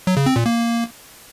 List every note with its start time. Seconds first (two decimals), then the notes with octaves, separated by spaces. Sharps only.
0.07 F#3
0.17 C#3
0.26 C4
0.36 A#2
0.46 A#3